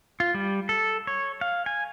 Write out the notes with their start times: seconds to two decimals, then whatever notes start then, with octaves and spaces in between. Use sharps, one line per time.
0.20 F4
0.34 G3
0.69 A4
1.07 C#5
1.41 F5
1.66 G#5